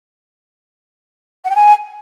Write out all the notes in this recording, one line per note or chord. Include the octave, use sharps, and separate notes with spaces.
F#5
G5
G#5